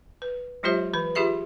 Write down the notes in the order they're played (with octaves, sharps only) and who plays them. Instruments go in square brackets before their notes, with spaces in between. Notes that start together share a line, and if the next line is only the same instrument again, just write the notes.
[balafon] B4
F#3 G#3 F4 G4 C5 E5
E3 B4
F4 G4 G#4 E5 B5